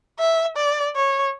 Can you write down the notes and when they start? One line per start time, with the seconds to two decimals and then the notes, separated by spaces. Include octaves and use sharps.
0.19 E5
0.57 D5
0.96 C#5